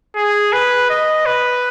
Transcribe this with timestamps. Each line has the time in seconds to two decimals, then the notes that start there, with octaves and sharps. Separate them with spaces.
0.16 G#4
0.53 B4
0.90 D#5
1.26 B4